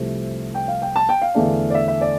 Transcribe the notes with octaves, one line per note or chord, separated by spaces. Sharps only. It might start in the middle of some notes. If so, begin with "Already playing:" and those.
Already playing: C2 C3 F3 A3
G5
F5
G5
A5
G5
F5
E2 D3 A3 D4
D5
E5
E5
D5